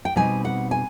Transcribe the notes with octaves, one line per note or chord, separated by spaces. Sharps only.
G5
B2 G3 C4 D#4 G#5
F#5
G#5